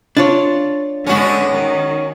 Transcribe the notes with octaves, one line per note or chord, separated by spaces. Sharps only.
D4 F4 C#5
D3 G#3 B3 C#4 F#4
D#3